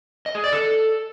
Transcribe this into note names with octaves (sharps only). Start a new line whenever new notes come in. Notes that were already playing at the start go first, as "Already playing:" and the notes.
D#5
G#4
D5
A4